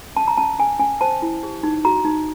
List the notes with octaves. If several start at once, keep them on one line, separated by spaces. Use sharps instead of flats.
C#4 A5
A#5
C#4 A5
C#4 G#5
C#4 G#5
C5 A5
E4
G4
D#4
F#4 A#5
D#4